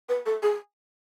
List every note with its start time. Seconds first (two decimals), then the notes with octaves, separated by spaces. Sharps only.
0.09 B4
0.26 A4
0.43 G#4